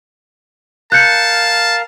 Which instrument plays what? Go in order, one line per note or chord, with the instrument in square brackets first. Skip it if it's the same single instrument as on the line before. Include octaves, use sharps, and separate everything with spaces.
[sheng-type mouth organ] A#4 F5 [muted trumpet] A5 [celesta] F#6 G6 C#7